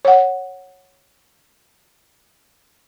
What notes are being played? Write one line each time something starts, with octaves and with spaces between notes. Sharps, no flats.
C#5 F#5